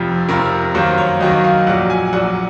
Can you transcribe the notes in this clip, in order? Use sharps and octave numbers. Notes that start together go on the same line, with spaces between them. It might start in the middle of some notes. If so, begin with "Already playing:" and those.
Already playing: F1 F2 C3 F3
F1 F2 C3 F3 A#4
F#2 D#3 F#3 A#3 C5
C#5
F#2 D#3 F#3 A#3 D#5
F5
A#1 A#2 F#3 F#5
G#5
A#1 A#2 F#3 F#5